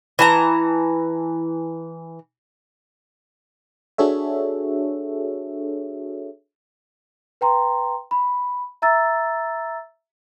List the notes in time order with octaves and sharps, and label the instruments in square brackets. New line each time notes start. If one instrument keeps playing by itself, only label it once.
[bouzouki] E3 A5 A#5
[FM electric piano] D4 F#4 G#4 A4 C#5 E5
[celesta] B4 G5 A#5 C6
B5
E5 A#5 E6 A6